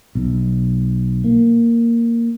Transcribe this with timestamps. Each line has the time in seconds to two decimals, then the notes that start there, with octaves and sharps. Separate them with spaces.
0.15 B1
1.24 A#3